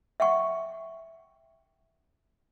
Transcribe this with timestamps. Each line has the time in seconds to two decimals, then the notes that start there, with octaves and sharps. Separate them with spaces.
0.20 E5 F#5 G5 C#6